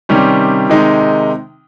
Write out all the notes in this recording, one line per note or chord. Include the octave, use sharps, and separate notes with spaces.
C3 D#3 G3 C#4
C3 D#3 G#3 D#4